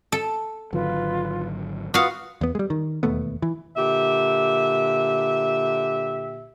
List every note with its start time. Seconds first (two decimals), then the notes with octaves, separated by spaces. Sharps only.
0.12 A4
0.73 G#1 D3 F#3 F4 B4
1.94 F4 F#4 B4 F5 D#6
2.41 E2 B3
2.55 G3 G#3
2.70 D#3
3.03 E1 D#2 A3 B3
3.42 E3
3.77 A#2 D3 G4 E5